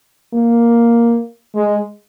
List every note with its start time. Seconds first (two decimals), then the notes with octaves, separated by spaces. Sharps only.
0.34 A#3
1.55 G#3